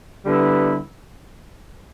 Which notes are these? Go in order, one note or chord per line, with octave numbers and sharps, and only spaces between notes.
D3 G3 B3 E4